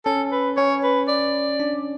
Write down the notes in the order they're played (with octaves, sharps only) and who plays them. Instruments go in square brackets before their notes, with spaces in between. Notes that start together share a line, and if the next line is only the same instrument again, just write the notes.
[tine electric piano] C#4 [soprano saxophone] A4
[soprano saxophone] B4
[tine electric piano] C#4 [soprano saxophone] C#5
[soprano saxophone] B4
D5
[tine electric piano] D4